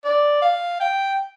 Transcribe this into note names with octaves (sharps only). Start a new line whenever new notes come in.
D5
F5
G5